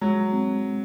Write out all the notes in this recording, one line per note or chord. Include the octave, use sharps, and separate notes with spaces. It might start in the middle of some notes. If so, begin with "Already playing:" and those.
F#3 G#3
C4